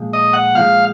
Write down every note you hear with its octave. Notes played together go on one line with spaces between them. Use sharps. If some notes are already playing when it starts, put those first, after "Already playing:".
Already playing: A#2 F3 G#3
D#5
F#5
A#2 F3 G#3 F5